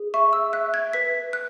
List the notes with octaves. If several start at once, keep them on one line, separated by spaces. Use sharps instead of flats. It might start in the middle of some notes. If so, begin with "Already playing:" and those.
Already playing: G#4
E5 C#6
E6
E5 F#6
G#6
B4 B6
F#6